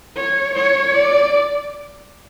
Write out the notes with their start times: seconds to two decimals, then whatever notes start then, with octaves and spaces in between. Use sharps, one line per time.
0.16 C#5
0.55 C#5
0.94 D5